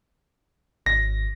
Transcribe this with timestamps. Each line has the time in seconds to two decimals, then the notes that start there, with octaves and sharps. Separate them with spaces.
0.86 G#1 A#6